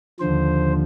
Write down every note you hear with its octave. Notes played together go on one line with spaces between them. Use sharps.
D#2 D3 F3 C5